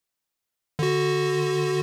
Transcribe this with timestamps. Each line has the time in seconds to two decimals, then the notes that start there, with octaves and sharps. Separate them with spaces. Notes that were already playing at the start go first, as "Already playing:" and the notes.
0.79 D3 F#4